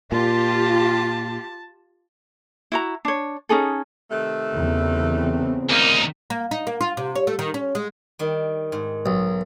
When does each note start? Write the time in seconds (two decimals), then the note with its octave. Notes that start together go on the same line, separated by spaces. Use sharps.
0.12 A#2 F4 G4 A5
2.72 E4 F#4 A#5
3.05 D4 C#5
3.49 C#4 D#4 G#4 A4
4.11 C3 D#3 A3
4.53 E2 C#3 C4
5.70 D2 A#3 D#4
6.30 A#3
6.51 D#4
6.67 A#3
6.81 F4
6.97 C3
7.15 C#5
7.27 A3
7.39 D#3
7.54 C#4
7.75 G#3
8.19 D#3 G3
8.72 G#2
9.06 B1